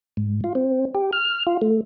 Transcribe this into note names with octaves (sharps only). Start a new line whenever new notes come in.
G#2
F4
C4
G4
F6
F4
A3